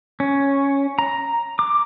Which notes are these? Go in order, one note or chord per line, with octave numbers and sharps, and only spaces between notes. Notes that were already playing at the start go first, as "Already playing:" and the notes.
C#4
A#5
D6